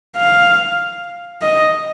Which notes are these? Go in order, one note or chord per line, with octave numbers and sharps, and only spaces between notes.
F5
D#5